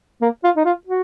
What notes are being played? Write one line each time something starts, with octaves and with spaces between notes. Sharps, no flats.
A#3
F4
D#4
F4
F#4